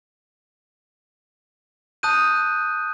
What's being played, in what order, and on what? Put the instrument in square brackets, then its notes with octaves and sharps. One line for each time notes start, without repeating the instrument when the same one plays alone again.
[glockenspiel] A5 D#6 F#6 G6 D#7